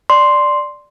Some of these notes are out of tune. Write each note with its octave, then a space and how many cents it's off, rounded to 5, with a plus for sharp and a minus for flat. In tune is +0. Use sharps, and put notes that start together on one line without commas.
D5 +0 C6 +0